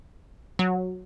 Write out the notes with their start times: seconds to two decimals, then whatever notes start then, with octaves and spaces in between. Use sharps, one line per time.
0.59 F#3